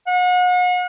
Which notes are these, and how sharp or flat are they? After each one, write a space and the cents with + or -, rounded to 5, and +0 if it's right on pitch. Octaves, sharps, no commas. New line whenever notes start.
F#5 -40